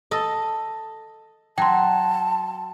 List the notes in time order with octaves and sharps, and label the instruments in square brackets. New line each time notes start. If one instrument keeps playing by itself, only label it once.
[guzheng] A4 D#5
[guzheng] F#3 [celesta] G5 C6 [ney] A5